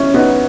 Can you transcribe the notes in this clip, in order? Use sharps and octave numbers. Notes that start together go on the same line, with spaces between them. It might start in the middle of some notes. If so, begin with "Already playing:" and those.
Already playing: C#4 E4
B3 D#4